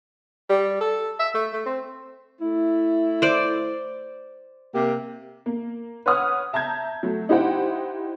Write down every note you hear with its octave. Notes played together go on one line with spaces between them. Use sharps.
G3
A4
E5
A3
A3
C4
A3 E4
C5 D5
C3 A#3 G4
A#3
B4 C#5 F#5 D#6 F6
E5 A5 A#5 G6 G#6
F#3 A3
D#4 E4 G4 C5 F#5 G5